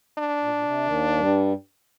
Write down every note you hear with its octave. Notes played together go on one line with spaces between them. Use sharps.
D4
A#2
A#2
C3
D#2 D#3
G2 G3